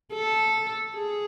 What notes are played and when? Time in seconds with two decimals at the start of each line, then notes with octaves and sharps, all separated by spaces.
0.13 A4
0.94 G#4